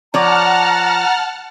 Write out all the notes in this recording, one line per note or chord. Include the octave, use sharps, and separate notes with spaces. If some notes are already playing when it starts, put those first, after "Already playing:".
F3 C#5 D5 F#5 A5 A#5 F6